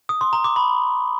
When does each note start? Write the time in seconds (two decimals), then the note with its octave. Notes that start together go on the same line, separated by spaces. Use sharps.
0.09 D#6
0.21 C6
0.33 A#5
0.44 D6
0.56 B5